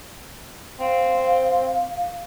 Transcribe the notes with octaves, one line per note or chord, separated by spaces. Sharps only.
C4 F5